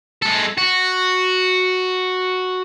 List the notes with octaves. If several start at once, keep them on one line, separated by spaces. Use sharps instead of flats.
G#3 A4
F#4